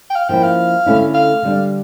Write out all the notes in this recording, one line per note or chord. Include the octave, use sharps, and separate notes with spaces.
G5
F5
F3 A#3 C#4 E4 G5
F5
D3 A3 C#4 E4
F5
D3 G3 D4